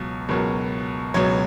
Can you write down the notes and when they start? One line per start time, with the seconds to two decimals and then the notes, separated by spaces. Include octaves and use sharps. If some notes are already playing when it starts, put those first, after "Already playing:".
Already playing: C#2 B2 F#3
0.29 C#2 B2 F#3 A#4
1.14 C#2 B2 F#3 C#5